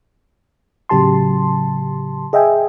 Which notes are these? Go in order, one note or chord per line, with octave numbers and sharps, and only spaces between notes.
A2 C#3 F#3 G4 A5 C6
G#4 D#5 E5 G5 G#5